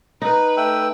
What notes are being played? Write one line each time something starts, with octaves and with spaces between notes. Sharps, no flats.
D#4 B4
A3 G5 E6